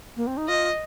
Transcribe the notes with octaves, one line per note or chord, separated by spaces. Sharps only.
A#3
C4
D#4
F4 D#5